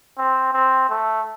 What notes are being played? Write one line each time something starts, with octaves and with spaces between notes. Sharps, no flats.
C4
C4
A3